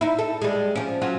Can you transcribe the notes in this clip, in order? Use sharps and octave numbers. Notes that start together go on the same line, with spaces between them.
D#4 E4
A4
G3 G#3
F3 C#4
F#3 C#4 F4